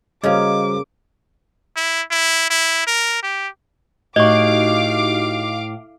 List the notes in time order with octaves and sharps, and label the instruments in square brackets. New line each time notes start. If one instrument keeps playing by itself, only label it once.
[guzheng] C#3 A#3 [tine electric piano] G3 F#4 C5 [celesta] D#5 F5 [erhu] D6
[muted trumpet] E4
E4
E4
A#4
G4
[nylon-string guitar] A2 [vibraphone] D#4 F#4 G4 [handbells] D#5 C#6 [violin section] F5 D6